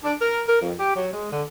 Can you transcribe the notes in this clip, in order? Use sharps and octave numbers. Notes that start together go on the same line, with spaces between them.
D4
A#4
A#4
F2
G4
F#3
G#3
D3